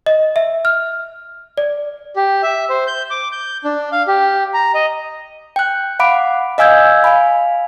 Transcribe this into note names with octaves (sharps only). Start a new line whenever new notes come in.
D#5
E5
F6
D5
G4
E5
C5
G6
D6
G6
D4
F5
G4
A#5
D#5
G5 F#6
F5 F#5 B5 D6 D7
D#5 F5 G#5 E6 G6 G#6
F5 G#5 B5